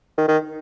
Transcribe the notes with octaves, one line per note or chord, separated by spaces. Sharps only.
D#3
D#3